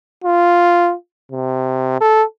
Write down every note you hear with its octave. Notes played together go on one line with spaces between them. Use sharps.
F4
C3
A4